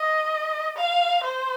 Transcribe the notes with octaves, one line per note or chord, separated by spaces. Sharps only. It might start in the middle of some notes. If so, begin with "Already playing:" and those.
Already playing: D#5
F5
C5